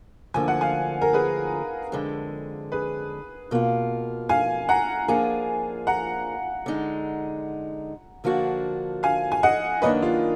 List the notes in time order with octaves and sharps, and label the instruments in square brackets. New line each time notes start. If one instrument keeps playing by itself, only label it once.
[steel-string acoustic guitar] D2 D3 F3 A#3 [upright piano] G#5
[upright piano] F#5
F5 G#5
A#4
G#4 B4
[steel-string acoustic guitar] F2 D3 G#3
[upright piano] G#4 B4
[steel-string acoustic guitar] B2 A#3 F4
[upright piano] F5 G#5
F#5 A#5
[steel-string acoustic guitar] F3 A#3 D4 G#4 [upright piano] F5 G#5
[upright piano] F#5 A#5
[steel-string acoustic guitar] D3 G#3 D#4
D3 F3 A#3 D4 F#4
[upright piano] F5 G#5
G#5
D#5 F#5
[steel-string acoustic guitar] F#2 D#3 A#3 D4 [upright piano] B4 D#5
[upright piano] F4